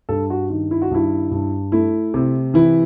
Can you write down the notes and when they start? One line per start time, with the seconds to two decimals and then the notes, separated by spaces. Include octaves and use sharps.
0.09 G2 A4
0.30 F#4
0.50 D#3
0.71 E4
0.82 F#4
0.91 G2 E4
1.31 G2
1.72 A3 E4
2.14 C3
2.54 E3 E4